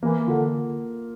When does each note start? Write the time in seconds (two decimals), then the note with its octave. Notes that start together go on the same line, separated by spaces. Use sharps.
0.03 E3 A#3
0.27 D3 F4